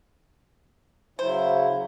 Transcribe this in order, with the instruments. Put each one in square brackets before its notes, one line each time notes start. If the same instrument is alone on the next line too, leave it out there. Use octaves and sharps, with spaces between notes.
[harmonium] C#3 F#3 E4 [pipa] C5